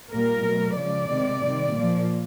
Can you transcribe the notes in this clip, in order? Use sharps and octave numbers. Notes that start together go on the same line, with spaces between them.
A#2 G3 A#3 A#4
B2 F#3 A3
C#3 F3 G#3 D5
C3 D#3 G#3
C3 D#3 G3
A#2 F3 A#3